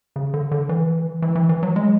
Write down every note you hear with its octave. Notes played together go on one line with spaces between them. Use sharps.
C#3
D3
D3
E3
E3
E3
E3
F#3
G#3